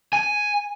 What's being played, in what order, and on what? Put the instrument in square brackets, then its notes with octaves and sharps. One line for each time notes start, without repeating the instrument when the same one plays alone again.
[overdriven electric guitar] G#5